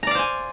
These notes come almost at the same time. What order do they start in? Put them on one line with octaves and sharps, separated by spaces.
A#5 D5 F5 C5 G#5